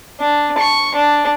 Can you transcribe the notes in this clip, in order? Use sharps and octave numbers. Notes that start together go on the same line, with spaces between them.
D4
C#6
D4